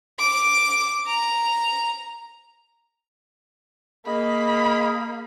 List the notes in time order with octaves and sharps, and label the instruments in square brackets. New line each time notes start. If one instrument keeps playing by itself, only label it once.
[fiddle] D6
A#5
[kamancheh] A#3 [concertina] G#4 D#5 [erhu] B5